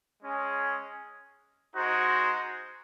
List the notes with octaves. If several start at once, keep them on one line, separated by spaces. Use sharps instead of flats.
G#3 C#4 G#4
G#3 D#4 F#4 C5